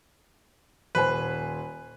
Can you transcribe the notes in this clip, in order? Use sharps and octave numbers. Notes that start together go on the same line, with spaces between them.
D#1 B4 C5 G#5